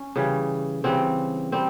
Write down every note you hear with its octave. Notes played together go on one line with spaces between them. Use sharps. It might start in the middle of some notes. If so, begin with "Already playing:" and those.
Already playing: C#4
C#3 E3 G3
C#3 E3 G3 C4
G3 C4